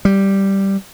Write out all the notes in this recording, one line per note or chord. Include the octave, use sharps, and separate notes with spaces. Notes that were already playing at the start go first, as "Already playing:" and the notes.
G3